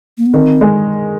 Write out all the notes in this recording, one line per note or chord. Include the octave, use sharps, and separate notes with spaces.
A#3
B3
D#3 C4
G#3